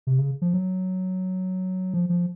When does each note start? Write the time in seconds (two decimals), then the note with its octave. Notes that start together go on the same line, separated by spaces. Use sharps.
0.07 C3
0.18 C#3
0.42 F3
0.54 F#3
1.94 F3
2.09 F3